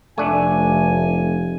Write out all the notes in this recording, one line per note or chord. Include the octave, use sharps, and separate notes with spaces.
F1 A3 D4 G#5